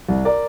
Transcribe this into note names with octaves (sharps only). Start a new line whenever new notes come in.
C2
A#4 D5